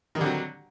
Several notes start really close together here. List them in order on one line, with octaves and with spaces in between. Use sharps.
D#3 G3 D3 C4 F#3